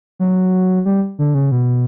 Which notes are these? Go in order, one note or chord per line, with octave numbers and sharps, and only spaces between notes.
F#3
G3
D3
C#3
B2